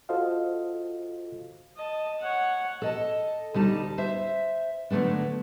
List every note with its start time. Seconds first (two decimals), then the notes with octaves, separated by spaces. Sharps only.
0.09 F4 F#4 A4 C5 D#5 F5
1.76 D#5 A5
2.20 C#5 F#5
2.82 A4 D#5 A5
3.54 D2 G3 D#4 A5
3.98 C5 E5
4.90 D3 F#3 A3 B3 D4